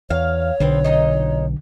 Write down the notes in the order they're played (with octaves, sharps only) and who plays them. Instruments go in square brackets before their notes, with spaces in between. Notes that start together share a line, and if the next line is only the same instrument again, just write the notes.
[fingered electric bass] E2 [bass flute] C#5 [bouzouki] F5
[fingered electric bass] B1 [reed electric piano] D3 [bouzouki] F3 C4 B4
[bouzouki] A#2 D#4 D#5